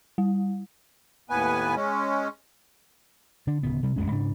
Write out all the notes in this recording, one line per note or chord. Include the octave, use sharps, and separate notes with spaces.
G3
D#2 A2 B3 B4 G#5
G#3 C#4
D3 D4
D1 C#3 B3
C3 G3
A1 F2 G#3 C#4
G#2 C#3 D4